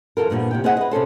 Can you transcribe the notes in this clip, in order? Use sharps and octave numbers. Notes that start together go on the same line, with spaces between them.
E3 F4 F#4 A4 A#4
G2 A#2 D#3 F3 B3
C3 E4 G5
C4 E4 G#4 D#5 E5 F#5
B4 D#5
C3 C#4 A4 C5